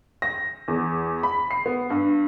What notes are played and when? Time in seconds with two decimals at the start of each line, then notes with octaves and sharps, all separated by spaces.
0.22 A#6
0.68 E2
1.23 B5
1.51 C7
1.66 B3
1.90 G2